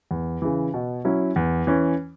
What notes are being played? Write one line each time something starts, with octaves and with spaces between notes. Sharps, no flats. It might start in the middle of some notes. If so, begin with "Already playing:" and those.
E2
C#3 E3
B2
F#3 C#4 E4
E2
E3 C#4